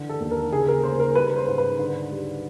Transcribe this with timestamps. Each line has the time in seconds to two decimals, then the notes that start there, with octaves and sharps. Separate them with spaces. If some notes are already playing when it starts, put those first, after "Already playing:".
Already playing: D3 E3
0.09 A4
0.20 D#2
0.31 A#4
0.52 C#3 G#4
0.68 A#4
0.83 C#3 C5
1.00 A#4
1.15 G3 B4
1.36 C5
1.47 G#2
1.58 B4
1.79 D3
2.11 G3